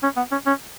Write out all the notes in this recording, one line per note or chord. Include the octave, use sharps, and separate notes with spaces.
C#4
B3
C#4
C#4